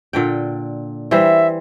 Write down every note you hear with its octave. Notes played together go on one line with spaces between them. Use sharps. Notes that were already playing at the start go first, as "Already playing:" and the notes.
A#2 D3 G5
E3 G3 C5 E5